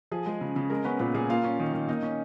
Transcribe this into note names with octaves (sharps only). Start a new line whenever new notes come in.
F3 G#4
G#3
C#3
C#3
G#3 A#4
B3 C#4 B4
A#2 B3 B4
A#2 G#4
A#3 F4 F5
C#4
D#3
D#3
A#3 D#4 D#5
C#4